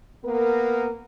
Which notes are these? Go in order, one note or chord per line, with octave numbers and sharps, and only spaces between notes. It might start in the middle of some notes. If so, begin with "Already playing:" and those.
A#3 B3 A#4